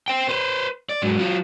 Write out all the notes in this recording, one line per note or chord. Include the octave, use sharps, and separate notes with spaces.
C5 G5
B4 C5
D5
G#2 F#3
F#3 F4